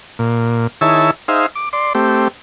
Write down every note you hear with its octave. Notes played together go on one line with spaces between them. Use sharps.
A#2
D#3 E4 G#4 C#5 E5 A5
D#4 G#4 C5 E5 F5
D6
D5 C6
A3 C4 G4